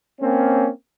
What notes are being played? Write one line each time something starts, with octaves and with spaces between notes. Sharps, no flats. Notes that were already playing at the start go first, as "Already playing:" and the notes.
A#3 C4 C#4